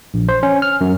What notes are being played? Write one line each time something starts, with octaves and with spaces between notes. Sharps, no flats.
A#1
C5
C#4
F6
F#2